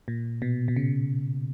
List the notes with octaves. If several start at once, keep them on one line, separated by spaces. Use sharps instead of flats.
A#2
B2
B2
C#3